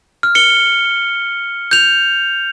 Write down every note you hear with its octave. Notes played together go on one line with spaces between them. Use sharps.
F6
C#7 G7
G6 F7